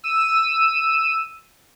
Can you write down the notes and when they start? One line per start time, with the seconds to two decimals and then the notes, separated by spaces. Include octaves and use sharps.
0.04 E6 D#7